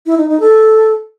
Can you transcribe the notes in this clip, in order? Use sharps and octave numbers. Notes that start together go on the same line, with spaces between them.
E4
D#4
D#4
A4